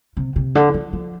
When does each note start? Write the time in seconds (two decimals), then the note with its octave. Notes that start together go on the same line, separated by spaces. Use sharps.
0.17 C3
0.36 C3
0.55 D3
0.74 F3
0.93 F3